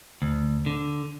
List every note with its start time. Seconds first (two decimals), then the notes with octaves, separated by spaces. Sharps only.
0.22 D2
0.66 D3